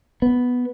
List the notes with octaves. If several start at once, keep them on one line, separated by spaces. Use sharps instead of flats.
B3